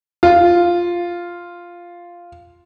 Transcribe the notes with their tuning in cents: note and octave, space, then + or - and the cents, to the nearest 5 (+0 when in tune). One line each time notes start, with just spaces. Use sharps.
F4 -5